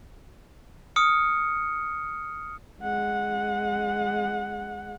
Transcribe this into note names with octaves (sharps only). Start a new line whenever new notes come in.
D#6 F6 C#7
G#3 F#5